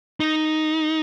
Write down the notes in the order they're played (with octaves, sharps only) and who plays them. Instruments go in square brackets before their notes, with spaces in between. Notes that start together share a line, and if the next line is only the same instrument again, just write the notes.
[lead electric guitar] D#4